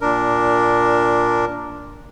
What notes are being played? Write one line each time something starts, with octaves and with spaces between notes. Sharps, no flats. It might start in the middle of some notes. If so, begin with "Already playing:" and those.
A#2 D4 A#4